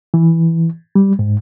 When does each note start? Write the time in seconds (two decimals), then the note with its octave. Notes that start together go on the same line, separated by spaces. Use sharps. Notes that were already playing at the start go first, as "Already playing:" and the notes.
0.14 E3
0.95 G3
1.19 G#2